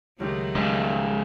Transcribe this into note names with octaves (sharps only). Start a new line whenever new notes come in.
C#2 D#3 F#3 A3 G4 F#6
G#2 C#3 G#3 C#5 G5